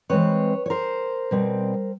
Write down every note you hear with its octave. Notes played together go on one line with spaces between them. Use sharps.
E3 G#3 C4 B4 C#5
C#5
A#4 C5
B2 G3 C4